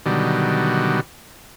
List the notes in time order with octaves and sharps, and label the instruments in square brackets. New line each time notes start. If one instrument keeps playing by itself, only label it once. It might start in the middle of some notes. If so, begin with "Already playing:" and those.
[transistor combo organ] B2 D3 D#3 F#3 G3